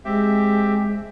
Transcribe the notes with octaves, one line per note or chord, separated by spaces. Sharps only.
G#3 C4 G4 E5